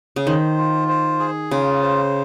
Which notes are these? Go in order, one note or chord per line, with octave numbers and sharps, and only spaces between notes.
C#3
D#3 C5
F4
C5
G#4
C#3 F4
C5